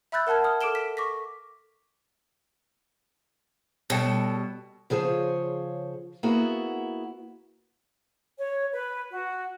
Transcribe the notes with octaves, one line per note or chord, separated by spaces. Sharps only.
E5 B5 E6 F#6 G6 A6
A#4 F#5 A5 F6 G#6
D#6 F6
A4 D6 F6 D7 E7 G7
B6
C#6 D6 A#6 B6
B2 G3 A4 C#5 D#5 G5
C#3 F3 G#4 C5 C#5
A#3 B3 E4 F#4 G#4
C#5
B4
F#4